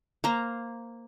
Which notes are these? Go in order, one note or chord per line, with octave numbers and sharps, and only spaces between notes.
A#3 C5 A#5